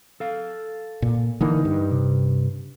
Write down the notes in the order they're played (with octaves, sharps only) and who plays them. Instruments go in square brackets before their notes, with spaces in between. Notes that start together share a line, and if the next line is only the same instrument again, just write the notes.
[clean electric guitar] A4 F5
[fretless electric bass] A#2
[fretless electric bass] D3 E3 A#3 [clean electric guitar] D#4
[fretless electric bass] G2
[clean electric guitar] C3